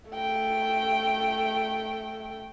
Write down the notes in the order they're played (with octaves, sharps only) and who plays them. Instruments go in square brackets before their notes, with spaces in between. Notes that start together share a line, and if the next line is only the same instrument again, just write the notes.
[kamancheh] A3 G5